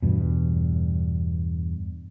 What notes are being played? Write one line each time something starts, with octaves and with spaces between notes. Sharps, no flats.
E2 G2 B2